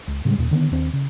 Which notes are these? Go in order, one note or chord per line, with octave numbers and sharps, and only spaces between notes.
C#2
A2 C#3 G3 G#3
D#2 A#2
D3 D#3 G3 B3
D#2 D#3 C4 D4
C#3